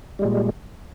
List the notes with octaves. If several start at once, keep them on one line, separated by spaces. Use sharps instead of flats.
A#2 G3 G#3